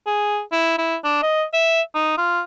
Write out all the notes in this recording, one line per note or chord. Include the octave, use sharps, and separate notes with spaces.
G#4
E4
E4
D4
D#5
E5
D#4
F4